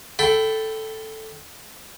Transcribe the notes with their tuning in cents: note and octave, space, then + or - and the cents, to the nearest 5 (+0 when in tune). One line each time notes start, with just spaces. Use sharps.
A4 +0 G5 -10 B5 +15